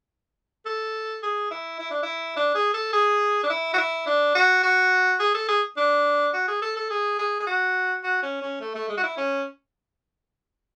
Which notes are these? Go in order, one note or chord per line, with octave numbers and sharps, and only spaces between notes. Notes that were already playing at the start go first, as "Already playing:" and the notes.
A4
G#4
E4
E4
D4
E4
D4
G#4
A4
G#4
D4
E4
F#4
E4
D4
F#4
F#4
G#4
A4
G#4
D4
F#4
G#4
A4
A4
G#4
G#4
G#4
F#4
F#4
C#4
C#4
A3
A3
G#3
F#4
E4
C#4